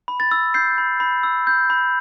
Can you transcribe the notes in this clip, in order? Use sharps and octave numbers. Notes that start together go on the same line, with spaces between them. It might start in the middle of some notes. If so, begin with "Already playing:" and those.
B5
A6
E6
G6 C7
B5
B5
E6
G6
B5